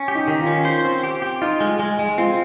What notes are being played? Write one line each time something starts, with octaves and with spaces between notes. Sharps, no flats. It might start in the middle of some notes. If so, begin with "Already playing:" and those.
Already playing: C#4
G4
D#4
D#3
F4
C#4
C5
C4
G4
G4
D#4 F4
G#3
G#3
G#3
C4 F4